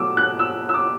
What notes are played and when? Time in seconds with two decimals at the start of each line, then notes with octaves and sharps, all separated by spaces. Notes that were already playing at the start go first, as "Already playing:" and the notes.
Already playing: B2 F#3 A3 D6 E6
0.17 F#6
0.39 E6
0.69 E6
0.74 D6